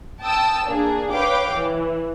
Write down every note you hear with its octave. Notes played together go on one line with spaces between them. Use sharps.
G5 A5 D#6 E6
A#3 D4 G#4
B4 C#5 F5 G5 D6
E3